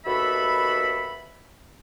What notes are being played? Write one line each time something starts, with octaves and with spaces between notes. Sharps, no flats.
D#2 B2 F#4 A4 E5 B5